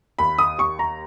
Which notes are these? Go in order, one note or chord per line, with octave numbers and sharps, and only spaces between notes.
D#2 B5
D#6
D#2 C#6
A#5